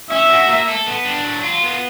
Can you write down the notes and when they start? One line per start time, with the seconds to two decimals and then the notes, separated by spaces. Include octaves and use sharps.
0.11 C#4 E5
0.31 F#4
0.49 A#3
0.68 A4
0.87 B3
1.05 D4
1.24 F#3
1.43 F4
1.62 B3